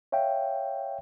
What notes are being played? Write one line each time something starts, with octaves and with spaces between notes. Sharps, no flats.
C#5 E5 F5 G5